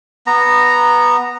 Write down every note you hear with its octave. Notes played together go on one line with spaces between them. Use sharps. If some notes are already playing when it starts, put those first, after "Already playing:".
B3 A#5